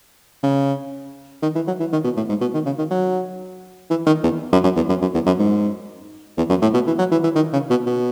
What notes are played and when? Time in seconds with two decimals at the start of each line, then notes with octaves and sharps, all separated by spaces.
0.43 C#3
1.42 D#3
1.55 E3
1.67 F#3
1.80 E3
1.93 D#3
2.04 B2
2.17 A2
2.29 G#2
2.41 B2
2.54 D#3
2.66 C#3
2.78 D#3
2.91 F#3
3.90 E3
4.07 D#3
4.24 E2
4.52 F#2
4.64 F#2
4.76 E2
4.89 F#2
5.02 F#2
5.14 E2
5.26 F#2
5.39 G#2
6.38 E2
6.50 F#2
6.62 A2
6.74 B2
6.87 E3
6.99 F#3
7.12 E3
7.24 E3
7.36 D#3
7.53 C#3
7.70 B2
7.86 B2